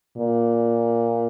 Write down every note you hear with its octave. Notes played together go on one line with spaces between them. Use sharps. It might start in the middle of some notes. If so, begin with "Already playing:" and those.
A#2